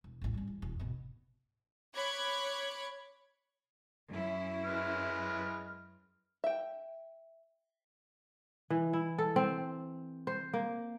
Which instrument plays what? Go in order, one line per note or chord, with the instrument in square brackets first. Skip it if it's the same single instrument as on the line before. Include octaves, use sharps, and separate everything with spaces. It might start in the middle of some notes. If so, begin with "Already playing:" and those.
[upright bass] E1
A1 D#2
G3 C#4
E2
E1
G#1 B2
[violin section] C#5 B5 D6 F#6 G#6
[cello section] F#2 C#4 E4
[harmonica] G#3 B4 F6
[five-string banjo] E5 G5
[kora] E3
E4
A4
C4
C5
A#3